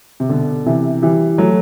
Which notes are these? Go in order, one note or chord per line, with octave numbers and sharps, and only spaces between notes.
C3
B2 D3
C3 E3
E3 G3
F#3 A3